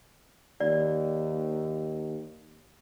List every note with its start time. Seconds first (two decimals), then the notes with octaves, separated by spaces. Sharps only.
0.60 D#2 D5